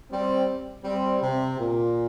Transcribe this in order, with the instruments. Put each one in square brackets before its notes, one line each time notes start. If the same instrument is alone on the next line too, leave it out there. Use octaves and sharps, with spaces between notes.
[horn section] G3 C4
G3 C4
C3
A#2